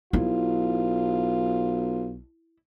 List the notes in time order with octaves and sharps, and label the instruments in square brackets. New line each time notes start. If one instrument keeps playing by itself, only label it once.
[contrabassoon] B1 [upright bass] E4 [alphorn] F4